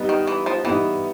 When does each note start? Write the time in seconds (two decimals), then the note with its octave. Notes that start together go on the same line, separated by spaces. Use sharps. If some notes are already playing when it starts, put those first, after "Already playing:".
Already playing: G3 B3 D#4
0.09 D#3
0.27 E3
0.46 F3
0.64 E3 G3 B3 D#4